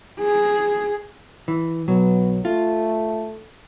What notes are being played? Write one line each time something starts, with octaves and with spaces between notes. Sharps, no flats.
G#4
E3
B1 F#3 B3
A3 F4